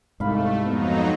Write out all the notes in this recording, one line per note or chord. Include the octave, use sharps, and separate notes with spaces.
C2 G#2 A3 F5 B5
F2 F#3 B3 D#4